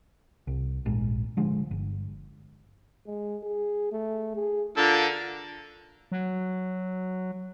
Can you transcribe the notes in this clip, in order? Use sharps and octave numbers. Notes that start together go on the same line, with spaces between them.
C2
D1 A#1 G#2
D3 F3 G#3
G1
G#3
G#4
A3
G#4
D3 F4 A4 A#4
F#3